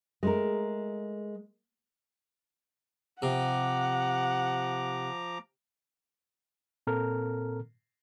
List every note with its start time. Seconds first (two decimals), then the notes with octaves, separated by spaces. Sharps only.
0.23 G#3 A3 A#4
3.22 C3 F3 F#5 A#5 D6
6.87 A#2 C4 A4 A#4 A#5 F6